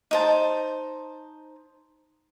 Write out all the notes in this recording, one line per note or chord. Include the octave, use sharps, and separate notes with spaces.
D#4 C5 A5